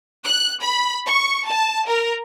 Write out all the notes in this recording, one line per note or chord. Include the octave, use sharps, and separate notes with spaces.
F#6
B5
C#6
A5
A#4